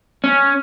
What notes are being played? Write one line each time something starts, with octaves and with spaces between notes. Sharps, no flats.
C#4